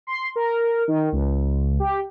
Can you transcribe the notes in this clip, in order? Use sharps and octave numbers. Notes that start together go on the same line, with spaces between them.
C6
A#4
D#3
C#2
G4